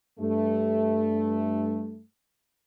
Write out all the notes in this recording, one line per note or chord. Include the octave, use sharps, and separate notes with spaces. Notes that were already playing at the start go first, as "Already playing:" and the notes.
G2 A3